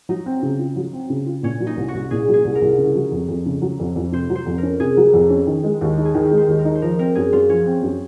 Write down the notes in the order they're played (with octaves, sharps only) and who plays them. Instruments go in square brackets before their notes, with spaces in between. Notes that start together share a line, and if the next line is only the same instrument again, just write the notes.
[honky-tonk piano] F#3 [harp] D#4
[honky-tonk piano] C4
C#3
F4
F#3
C4
C#3
F4
[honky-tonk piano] A#2 [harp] C#4
[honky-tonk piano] F#3
[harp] D#4
[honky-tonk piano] C2
[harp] F#4
[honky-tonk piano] C2
[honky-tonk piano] A#2 [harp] G#4
[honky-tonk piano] F#3
[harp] G#4
[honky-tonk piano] C2
[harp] A#4
[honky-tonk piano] C2
C#3
F#3
F2
F2
C#3
F#3
F2
F2
[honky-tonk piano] C3 [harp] C5
[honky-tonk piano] F#3
[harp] C5
[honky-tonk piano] F2
[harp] A#4
[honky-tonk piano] C#4
[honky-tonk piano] C3 [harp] G#4
[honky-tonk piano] F#3
F2
C#4
D#3
G#3
D#2
D#4
[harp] G#4
[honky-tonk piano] D#3 [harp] A#4
[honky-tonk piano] G#3
[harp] C5
[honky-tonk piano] D#2
[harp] A#4
[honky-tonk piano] D#4
[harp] C5
[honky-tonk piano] F3 [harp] A#4
[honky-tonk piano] C4 [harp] A#4
[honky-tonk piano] F#2 [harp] G#4
[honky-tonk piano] F#2 [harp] F4
[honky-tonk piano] F3 [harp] C#4
[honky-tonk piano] C4
F#2